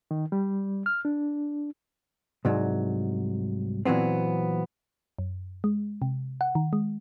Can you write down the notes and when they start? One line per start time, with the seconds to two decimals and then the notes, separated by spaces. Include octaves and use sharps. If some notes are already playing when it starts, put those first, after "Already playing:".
0.11 D#3
0.32 G3
0.86 F6
1.05 D4
2.45 C2 G#2 F#3
3.85 A#2 E3 F#3 B3 C4
5.19 F#2
5.64 G#3
6.02 C3
6.41 F#5
6.55 D#3
6.73 G#3